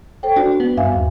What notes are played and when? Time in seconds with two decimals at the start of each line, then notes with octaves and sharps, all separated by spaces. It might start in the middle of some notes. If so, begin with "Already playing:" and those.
0.23 A4 C5 G5
0.36 D4 F#4
0.60 B3
0.77 G2 E5 F5 G#5
0.92 D#2